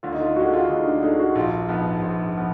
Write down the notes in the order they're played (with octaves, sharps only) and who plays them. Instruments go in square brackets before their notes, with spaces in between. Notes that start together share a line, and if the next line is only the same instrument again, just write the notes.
[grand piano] D2 [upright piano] F4
[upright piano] D#4
F4
[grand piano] D3 G#3 [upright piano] F#4
[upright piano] F4
[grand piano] D2 [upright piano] D#4
[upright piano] D4
[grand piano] D3 G#3 [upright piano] D#4
[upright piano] F#4
[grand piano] A#1 [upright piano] F4
[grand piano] G#2 F3 B3
A#1
F3 B3